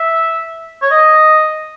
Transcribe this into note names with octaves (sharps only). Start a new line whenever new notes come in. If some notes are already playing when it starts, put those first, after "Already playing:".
Already playing: E5
C#5
D#5